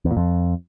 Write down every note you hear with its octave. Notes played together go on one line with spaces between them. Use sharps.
E2
A#2
F2